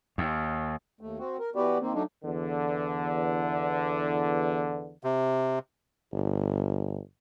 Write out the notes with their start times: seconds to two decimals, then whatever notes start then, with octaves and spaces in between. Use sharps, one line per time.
0.18 D#2
1.01 D#2 A3
1.19 C4 F#4
1.39 A#4
1.55 E3 B3 F#4 G4 B4 D5
1.80 D#3 A#3 C4
1.94 F#3 A3 D4 D#4
2.23 E2 D3
5.03 C3
6.13 G1